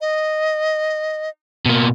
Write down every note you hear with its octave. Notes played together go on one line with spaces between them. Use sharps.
D#5
B2 A#3